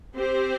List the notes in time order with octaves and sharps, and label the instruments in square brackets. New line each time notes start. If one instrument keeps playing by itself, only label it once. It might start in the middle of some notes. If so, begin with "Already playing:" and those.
[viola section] C4 G4 C5